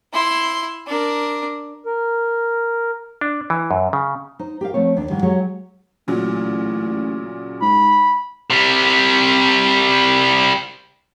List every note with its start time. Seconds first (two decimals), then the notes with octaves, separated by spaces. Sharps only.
0.13 E4 C6
0.87 D4 A#4
1.86 A#4
3.21 D4
3.50 E3
3.71 F#2
3.93 C#3
4.39 D#4 C5
4.61 G4 A#4 F5
4.74 F3 A3 C4 C#5
4.97 D#2 D4
5.10 G#2 D#3 E3 G3
5.23 F#3 G#3 G4 C#5
6.08 A1 A#2 C#3 F#3
7.61 G#2 B5
8.50 C3 G3